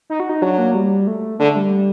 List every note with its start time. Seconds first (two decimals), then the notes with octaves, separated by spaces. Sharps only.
0.10 D#4
0.20 F#4
0.29 D#4
0.42 F#3 D4
0.58 A#3
0.74 G3
1.07 A3
1.39 D3 A3
1.56 G3